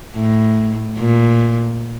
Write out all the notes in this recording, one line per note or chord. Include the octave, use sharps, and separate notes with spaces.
A2
A#2